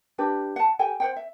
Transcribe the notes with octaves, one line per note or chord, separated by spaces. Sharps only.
D4 G4 B4
F#5 A5
G4 A4 G5 G#5
C5 F#5 G5
E5